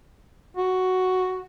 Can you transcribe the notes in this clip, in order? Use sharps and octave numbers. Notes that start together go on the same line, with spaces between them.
F#4